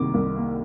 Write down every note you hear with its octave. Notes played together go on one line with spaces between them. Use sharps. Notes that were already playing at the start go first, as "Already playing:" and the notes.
Already playing: C2 C3 D#3 A#3 D6
C2
A#3